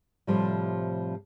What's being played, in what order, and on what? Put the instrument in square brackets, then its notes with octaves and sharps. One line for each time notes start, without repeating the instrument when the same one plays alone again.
[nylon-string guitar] A2 C3 F3 G3